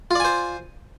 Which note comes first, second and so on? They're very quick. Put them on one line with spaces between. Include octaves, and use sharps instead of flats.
F4 D5 G#5 C5